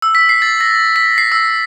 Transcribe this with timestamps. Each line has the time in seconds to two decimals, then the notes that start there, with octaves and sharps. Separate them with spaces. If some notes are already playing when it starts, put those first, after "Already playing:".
0.02 E6
0.15 B6
0.29 C7
0.42 A6
0.61 A#6
0.96 B6
1.18 C7
1.32 E6